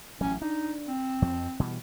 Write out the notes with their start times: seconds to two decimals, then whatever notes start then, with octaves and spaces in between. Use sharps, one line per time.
0.21 A1 F#3 C#4
0.42 D4 D#4
0.88 C4
1.22 F2 F3
1.60 B2 E3 G3